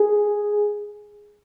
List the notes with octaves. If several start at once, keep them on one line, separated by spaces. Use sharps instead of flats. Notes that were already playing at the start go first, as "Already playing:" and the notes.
Already playing: G#4